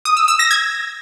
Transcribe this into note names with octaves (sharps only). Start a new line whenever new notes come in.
D#6
E6
E6
A#6
G#6